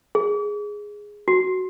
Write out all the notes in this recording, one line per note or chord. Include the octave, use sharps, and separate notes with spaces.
G#4
F#4